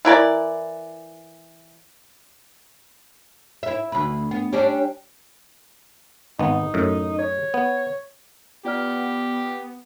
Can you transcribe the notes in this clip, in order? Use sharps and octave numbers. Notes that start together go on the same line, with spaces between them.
E3 E4 A#4 D5
E4 E5
D2 B4
B3
G3 C#4 D4
G#1 B3 D#4
F#2 A2
C#5
B3
B3 F4 G4 D5 F6